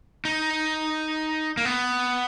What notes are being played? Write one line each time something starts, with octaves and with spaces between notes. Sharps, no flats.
D#4
A#3
B3